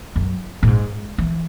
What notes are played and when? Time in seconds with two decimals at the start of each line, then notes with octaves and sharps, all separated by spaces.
0.16 F#2
0.63 A2
0.67 G#2
1.18 E3